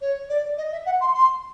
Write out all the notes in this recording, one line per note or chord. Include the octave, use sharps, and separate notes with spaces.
C#5
D5
D#5
E5
F#5
C6
C6